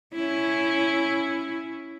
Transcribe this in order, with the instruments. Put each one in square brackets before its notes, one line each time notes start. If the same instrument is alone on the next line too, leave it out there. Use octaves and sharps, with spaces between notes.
[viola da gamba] C#4 E4